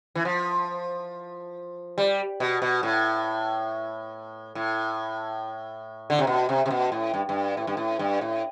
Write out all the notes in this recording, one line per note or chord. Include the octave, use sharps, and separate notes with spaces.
E3
F3
G3
B2
B2
A2
A2
D3
C3
B2
C3
C3
B2
A2
G2
G2
A2
G2
A2
G2
A2